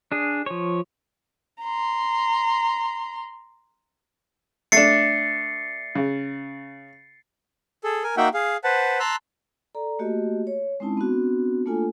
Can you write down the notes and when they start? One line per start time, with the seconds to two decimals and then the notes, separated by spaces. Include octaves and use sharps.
0.12 D4 G#4
0.46 F3 C#5
1.62 A#5 C6
4.72 A3 D4 A6 C7 C#7
5.95 C#3
7.84 G#4 A4
8.04 A#4 G#5
8.17 A#3 D#4 F#4 E5 F#5 G5
8.34 G#4 F5
8.64 B4 C5 F#5 A5
9.00 A5 A#5 C6 E6 F#6
9.75 A4 D5 A#5
9.99 A3 A#3 F#4 G4 D#5
10.47 C#5
10.80 G#3 C4 C#4 D#4 E4 A5
10.97 B3 C4 D4 F#4
11.66 A3 A#3 D4 F4 A4 G#5